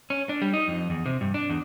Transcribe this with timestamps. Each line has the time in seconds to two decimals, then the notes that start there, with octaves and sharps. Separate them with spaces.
0.10 C#4
0.29 D4
0.42 G3
0.53 D#4
0.68 F2
0.90 E2
1.06 C3
1.21 G2
1.34 D4
1.49 E2